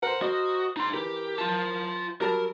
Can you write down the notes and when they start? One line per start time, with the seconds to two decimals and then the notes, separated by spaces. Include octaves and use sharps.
0.03 A#4 C5 F#5
0.22 F#4 D#5
0.77 D#4 C6
0.94 E3 G4 A#4
1.38 F4 A5
2.21 F#3 G3 A#4 A5